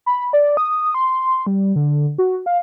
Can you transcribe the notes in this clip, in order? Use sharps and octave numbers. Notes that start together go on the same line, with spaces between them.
B5
D5
D#6
C6
G3
D3
F#4
F5